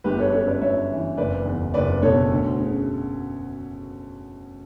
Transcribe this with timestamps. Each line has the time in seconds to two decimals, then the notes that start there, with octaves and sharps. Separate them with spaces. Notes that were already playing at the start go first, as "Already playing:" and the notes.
0.04 G1 G4 B4
0.18 A4 C#5
0.32 F#2 A4 C#5
0.47 B4 D5
0.61 G1 C#5 E5
0.90 E3
1.17 F#1 B4 D5
1.45 E2
1.74 F#1 B4 D5
2.02 B2 A4 C#5
2.31 D2
2.59 C#3